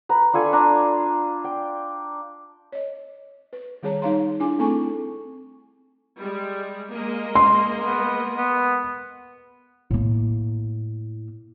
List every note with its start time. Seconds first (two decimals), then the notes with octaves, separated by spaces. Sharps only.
0.09 B4 A#5
0.33 D4 F4 A4 G#5
0.52 D4 D5 A#5 C6
1.44 G5
2.72 C#5 D#5
3.53 B4
3.83 D#3 G3 G#4 C#5 A5 A#5
4.02 G3 D#4 C#5 F5 A#5 C6
4.40 D4 E4 G#4 G#5 D6
4.59 A3 C4 A4 G#5 A5 C#6
6.20 G3 G#3
6.92 G#3 A#3 D#5
7.35 C6
7.85 B3
8.37 B3
9.91 A2 A#3